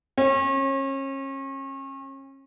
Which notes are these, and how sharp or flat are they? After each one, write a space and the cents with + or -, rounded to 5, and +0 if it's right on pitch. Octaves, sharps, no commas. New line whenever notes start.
C#4 -35